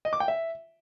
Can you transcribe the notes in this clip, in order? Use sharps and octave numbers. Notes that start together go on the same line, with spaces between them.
D#5
D6
G5
E5